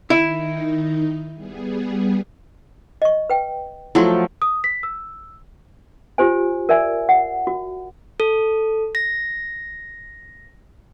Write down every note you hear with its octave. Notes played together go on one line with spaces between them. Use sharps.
D#3 D#4 E4
G3 B3 G#4
D#5 C#6
B4 G5
F3 F#3 A3 E4 F#5 C6
D#6
B6
E6
F4 G4 C5 G#5
A#4 D5 E5 G#5
F#5
F#4
A4
A#6